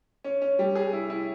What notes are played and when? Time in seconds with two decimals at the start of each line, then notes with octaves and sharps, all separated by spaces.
0.24 C#4
0.42 C#4
0.59 G3
0.75 G#4
0.93 E4
1.10 E4